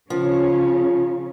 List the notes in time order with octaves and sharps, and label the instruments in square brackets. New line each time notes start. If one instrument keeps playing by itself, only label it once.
[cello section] C#3 C#4 [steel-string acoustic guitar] F3